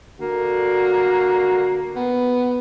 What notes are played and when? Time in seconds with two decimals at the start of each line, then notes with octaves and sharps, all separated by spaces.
0.20 D3 A#3 F#4
1.96 B3